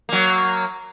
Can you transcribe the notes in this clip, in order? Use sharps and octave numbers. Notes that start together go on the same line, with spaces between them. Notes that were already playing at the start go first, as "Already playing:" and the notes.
F#3 A#3